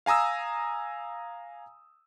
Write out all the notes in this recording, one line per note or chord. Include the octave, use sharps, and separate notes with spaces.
F5 G#5 A#5 D#6 E6